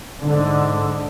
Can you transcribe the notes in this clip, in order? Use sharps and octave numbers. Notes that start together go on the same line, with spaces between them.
G#2 D3